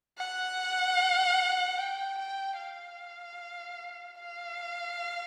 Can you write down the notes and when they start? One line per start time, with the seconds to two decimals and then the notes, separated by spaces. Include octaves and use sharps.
0.18 F#5
1.78 G5
2.19 G5
2.59 F5
4.19 F5